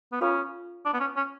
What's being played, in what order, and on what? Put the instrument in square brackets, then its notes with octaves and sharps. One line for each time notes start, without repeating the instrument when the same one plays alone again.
[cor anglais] B3
[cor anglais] C#4 [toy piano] F4 A4 C#5 F5 B5
[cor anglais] D4
B3
C#4
C#4